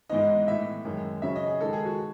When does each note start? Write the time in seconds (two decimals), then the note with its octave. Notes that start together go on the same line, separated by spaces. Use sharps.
0.09 G#2 E3 G#3 B3 D#4 D#5
0.48 A2 E3 B3 E5
0.85 F#2 D#3 G#3
1.22 C#3 F#3 C#4 E5
1.36 D#5
1.47 G#4
1.60 D#3 G#3 D#4 A4
1.73 G#4
1.85 F#4